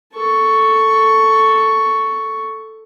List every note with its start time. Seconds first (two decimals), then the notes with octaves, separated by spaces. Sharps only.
0.12 A4 C#6